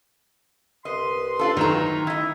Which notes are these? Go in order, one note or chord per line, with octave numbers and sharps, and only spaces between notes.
C2 B4 D#5 C6
D4 F4 A4
A2 D#3 F#3 A#5
E4 D#5